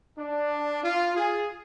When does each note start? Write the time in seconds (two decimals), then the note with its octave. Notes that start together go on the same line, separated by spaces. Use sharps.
0.18 D4
0.84 F4
1.17 G#4